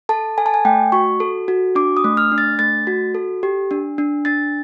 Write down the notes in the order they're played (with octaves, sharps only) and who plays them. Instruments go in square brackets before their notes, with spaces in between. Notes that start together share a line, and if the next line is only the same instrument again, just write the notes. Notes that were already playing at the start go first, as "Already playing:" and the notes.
[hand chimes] A4 A5
A4 G#5
A5
G#5
A3 G5
F#4 C#6
A4
F#4
D4 D6
D#6
A3
F6
D4
A6
A3 A6
F#4
A4
G4
D4
D4
D4 A6